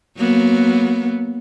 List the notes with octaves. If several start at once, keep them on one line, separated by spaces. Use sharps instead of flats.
F#3 A#3 B3